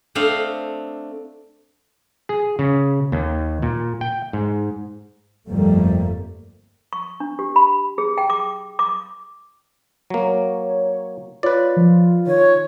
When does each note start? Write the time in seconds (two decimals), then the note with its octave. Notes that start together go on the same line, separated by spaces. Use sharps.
0.15 A3 C4 D4 D#5 F5
2.29 G#4
2.59 C#3
3.12 D#2
3.62 A#2
4.01 G5
4.33 G#2
5.49 G1 F2 G3 A3 A#3
6.93 C#6
7.20 D4
7.39 G4
7.56 B5
7.98 G#4
8.18 G5
8.30 D6
8.79 D6
10.10 F#3 A#3 C#5
11.43 F4 B4 C#5 D5
11.77 F3
12.27 D#3 C#5